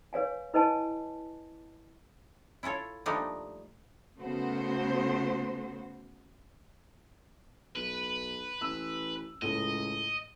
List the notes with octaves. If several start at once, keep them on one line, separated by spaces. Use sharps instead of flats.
B4 C#5 F5 G#5
E4 B4 D#5 G#5 A5
E4 F4 A4 C#5
F3 G3 A3 A#3 D4 D#4
C#3 A3 B3 F#4 C5
B1 B4
A1 E6
C#2 A2 D#5